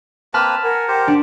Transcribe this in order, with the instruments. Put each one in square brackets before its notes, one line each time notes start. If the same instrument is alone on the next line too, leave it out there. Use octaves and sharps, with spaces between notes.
[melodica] A#3 C4 B4 [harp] A5 B5 F6
[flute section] A#4 F#5 [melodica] G#5
[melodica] G4 C5
[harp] D4